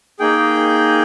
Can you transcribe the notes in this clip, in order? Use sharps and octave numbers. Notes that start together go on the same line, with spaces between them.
A#3 D#4 G#4 G5